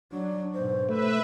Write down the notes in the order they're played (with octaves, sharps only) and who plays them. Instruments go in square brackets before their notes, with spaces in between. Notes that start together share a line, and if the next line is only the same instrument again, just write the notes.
[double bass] F#3 [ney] D4
[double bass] G#2 B2 [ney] C5
[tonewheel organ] A3 [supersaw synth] B4 E5